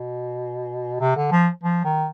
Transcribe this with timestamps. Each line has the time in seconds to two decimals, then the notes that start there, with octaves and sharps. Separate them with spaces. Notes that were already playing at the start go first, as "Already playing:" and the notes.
Already playing: B2
1.00 C3
1.16 D3
1.32 F3
1.63 F3
1.84 D#3